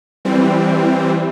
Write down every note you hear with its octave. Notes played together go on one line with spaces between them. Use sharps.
E3 G3 C4